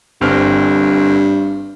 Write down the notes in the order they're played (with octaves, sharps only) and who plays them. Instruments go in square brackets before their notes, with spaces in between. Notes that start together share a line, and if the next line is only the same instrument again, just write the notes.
[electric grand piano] G1 C4 F6 [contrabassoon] G2